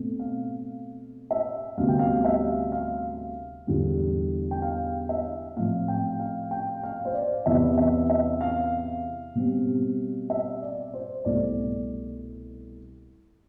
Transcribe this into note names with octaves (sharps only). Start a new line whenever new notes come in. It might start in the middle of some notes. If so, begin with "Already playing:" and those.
Already playing: B2 A3 C4
F5
E5
D2 C3 G3 B3 F5
G5
F5
E5
F5
E2 D3 G3
G5
F5
E5
A2 F3 C4 F5
G5
F5
G5
F5
C5
D5
E2 C3 E3 B3 E5
E5
E5
F5
B2 G3 C4
E5
D5
C5
C2 B2 A3 D5